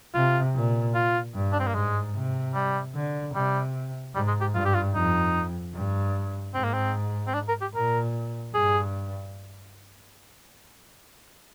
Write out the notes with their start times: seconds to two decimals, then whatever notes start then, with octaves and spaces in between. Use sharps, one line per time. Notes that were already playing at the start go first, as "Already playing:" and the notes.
0.14 C3 F4
0.55 A#2
0.94 F4
1.34 G2
1.53 D4
1.60 C4
1.67 A#3
1.74 G#2 G#3
2.14 C3
2.54 G3
2.95 D3
3.35 C3 G3
4.15 G#2 G3
4.27 G#3
4.40 G4
4.55 G2 F4
4.65 G4
4.74 F4
4.95 F2 D#4
5.74 G2
6.54 G#2 C4
6.64 A#3
6.74 C4
7.27 C4
7.34 D4
7.48 A#4
7.61 G4
7.75 A#2 A#4
8.54 G2 G#4